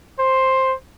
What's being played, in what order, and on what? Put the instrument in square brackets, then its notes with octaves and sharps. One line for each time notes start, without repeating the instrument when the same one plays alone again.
[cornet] C5